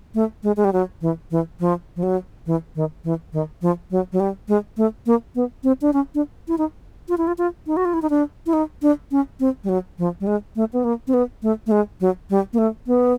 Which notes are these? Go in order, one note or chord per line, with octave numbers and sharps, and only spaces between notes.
A3
G#3
G#3
G3
F#3
E3
E3
F3
F3
F#3
E3
D#3
E3
D#3
F3
F#3
F#3
G3
G#3
A3
A#3
B3
C4
D4
C#4
D4
E4
D#4
F4
E4
F4
F4
D#4
F#4
F4
E4
D#4
D4
E4
D#4
D4
C#4
C4
G3
F#3
F3
G3
G#3
A3
B3
A#3
C4
B3
A3
A3
G#3
F#3
G3
A#3
A3
B3